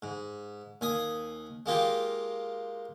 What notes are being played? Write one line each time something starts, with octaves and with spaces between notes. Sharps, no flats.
G#2
D#2 G#5 D#6
G#3 A#3 F4 G4